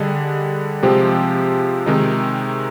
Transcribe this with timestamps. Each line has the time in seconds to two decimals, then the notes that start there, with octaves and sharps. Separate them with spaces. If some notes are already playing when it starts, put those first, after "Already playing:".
Already playing: D3 G3 D4 G#4 D#5
0.83 C3 F3 G#3 C4 G4
1.86 C3 D#3 G#3 D#4